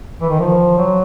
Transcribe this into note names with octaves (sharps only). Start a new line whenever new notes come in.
E3
D#3
F3
F#3